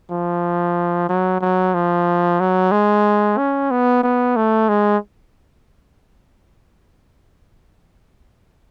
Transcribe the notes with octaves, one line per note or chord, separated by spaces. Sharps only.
F3
F#3
F#3
F3
F#3
G#3
C#4
B3
B3
A3
G#3